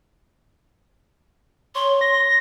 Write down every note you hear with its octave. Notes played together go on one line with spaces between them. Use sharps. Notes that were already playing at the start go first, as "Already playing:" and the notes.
C#5 C6
A#6